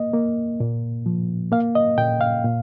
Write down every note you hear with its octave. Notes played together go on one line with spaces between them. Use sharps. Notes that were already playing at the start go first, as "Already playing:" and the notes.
Already playing: A#3 D#5
A#3
A#2
F3
A#3 F5
D#5
A#2 G5
F5
A#2